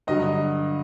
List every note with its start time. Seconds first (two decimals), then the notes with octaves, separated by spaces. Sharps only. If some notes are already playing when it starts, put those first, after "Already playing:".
0.07 G2 D3 F#3 D#5